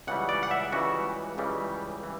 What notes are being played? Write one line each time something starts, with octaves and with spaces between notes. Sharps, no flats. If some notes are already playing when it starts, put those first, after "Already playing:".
C#2 C#3 E3 G3 F#5
D5
F#5
E5
C#2 C#3 E3 G3 F#4
C#2 C#3 E3 G3
E3 G3